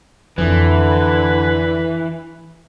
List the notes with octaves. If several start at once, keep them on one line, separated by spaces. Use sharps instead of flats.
F2 D3 E3 B4